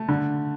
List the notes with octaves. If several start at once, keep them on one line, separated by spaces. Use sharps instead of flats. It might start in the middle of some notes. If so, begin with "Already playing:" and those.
Already playing: A3
D3